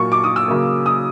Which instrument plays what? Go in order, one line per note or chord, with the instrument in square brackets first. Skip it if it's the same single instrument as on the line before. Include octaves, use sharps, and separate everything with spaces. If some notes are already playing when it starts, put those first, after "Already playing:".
Already playing: [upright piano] A#2 F#3 A#3 C#6
D6
D#6
E6
C#3 F#3 A#3
D#6